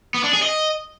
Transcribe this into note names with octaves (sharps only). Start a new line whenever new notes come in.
B3
D4
G#4
D#5